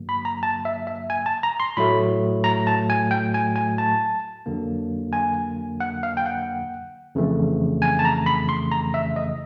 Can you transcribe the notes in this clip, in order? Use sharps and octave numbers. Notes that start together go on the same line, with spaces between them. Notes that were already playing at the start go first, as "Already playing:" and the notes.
Already playing: G2 D3 F#3 A#3
B5
A#5
A5
E5
E5
G#5
A5
A#5
C6
A2 F#3 A3 B5
A#5
A5
G#5
G5
G#5
G#5
A5
F2 D3 F#3 A#3
G#5
F#5
F5
G5
F#5
F2 C#3 E3 A3
G#5
A5
A#5
B5
C6
A#5
E5
D#5